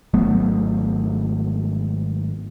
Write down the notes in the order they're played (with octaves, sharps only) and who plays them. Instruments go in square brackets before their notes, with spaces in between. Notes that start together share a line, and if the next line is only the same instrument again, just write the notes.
[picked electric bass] G#1 F#3 A3 B3